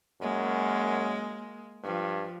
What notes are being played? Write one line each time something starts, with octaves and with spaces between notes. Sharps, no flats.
F#2 G#3 A#3
G2 F3